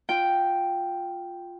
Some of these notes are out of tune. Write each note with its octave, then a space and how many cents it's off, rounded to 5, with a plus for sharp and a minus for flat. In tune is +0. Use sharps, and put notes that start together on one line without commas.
F4 +10 G5 +0